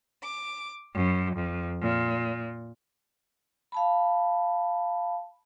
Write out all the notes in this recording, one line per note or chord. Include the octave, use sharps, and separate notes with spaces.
D6
F#2
F2
A#2
F5 A5 B5